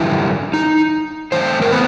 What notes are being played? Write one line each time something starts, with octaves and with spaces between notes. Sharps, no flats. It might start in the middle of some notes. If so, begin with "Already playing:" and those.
Already playing: F#2 D3 E3 G3 E4
D#4
A2 E3 A3 C4 C5
A#4
B3 B4